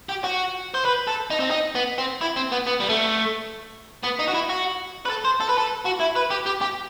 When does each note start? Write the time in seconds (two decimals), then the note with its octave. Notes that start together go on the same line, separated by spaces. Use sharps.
0.09 G4
0.24 F#4
0.74 C5
0.85 B4
1.07 A4
1.31 D#4
1.40 C4
1.51 D#4
1.75 B3
1.98 C4
2.21 E4
2.36 C4
2.52 B3
2.66 B3
2.80 G3
2.89 A3
4.03 B3
4.19 D#4
4.27 F#4
4.34 E4
4.49 F#4
5.05 B4
5.09 A4
5.25 C5
5.40 A4
5.49 B4
5.58 A4
5.86 F#4
6.01 E4
6.16 B4
6.31 G4
6.46 G4
6.62 G4